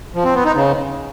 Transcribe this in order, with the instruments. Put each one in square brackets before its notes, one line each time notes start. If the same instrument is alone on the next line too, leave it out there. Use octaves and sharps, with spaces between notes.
[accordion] F3
C4
B3
D#4
C#3